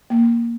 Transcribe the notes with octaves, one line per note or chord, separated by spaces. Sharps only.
A#3